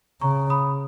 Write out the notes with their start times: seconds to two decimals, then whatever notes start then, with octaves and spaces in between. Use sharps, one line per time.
0.21 C#3 A#5 C#6
0.50 B5 D#6